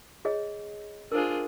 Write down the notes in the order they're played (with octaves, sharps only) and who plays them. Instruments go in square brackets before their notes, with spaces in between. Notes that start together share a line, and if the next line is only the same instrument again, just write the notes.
[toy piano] G#4 C#5 D#5
[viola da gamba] D4 F4 G#4 [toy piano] A#4 C5